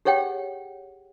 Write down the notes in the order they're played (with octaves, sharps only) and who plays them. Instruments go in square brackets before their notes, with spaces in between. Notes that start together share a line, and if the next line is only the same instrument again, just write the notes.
[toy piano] G4 G#4 C#5 F#5 G5